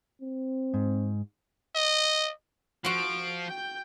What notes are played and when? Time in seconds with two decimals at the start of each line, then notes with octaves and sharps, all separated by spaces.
0.22 C4
0.74 G#2
1.76 D#5
2.85 F3 F#4 C6 D7
3.46 G5 G6